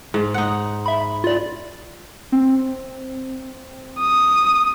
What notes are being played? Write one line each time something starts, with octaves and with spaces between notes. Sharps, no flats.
G#2
D#4 F#5
E5 B5
F4 D5
C4
D#6